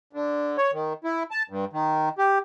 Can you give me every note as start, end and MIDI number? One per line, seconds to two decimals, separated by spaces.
0.13 0.57 50
0.58 0.71 73
0.72 0.93 51
1.04 1.23 64
1.31 1.43 81
1.50 1.65 43
1.73 2.09 51
2.18 2.38 67